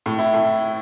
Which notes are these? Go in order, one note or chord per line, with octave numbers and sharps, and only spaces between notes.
A2
E4
A2